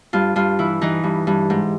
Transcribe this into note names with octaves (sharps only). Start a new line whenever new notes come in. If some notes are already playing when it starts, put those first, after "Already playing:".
G2 F4
G2 F4
E3 E4
E3 D#4
G2
G2
G#2